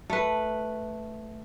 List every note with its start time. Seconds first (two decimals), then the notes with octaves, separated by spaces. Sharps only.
0.10 A3 B4